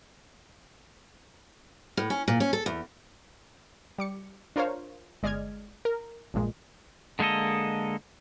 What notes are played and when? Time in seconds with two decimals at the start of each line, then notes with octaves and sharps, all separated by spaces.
1.97 A2
2.10 C#4
2.28 A#2
2.40 C#4
2.53 A4
2.66 E2
3.98 G3 D6 C#7
4.56 D4 F4 A#4 C5 C#5 F5
5.23 G1 G#3 D5 D#5 F6 G#6
5.85 A#4
6.34 A#1 G2 A#2 G#3
7.19 D3 G#3 A#3 A4 D#5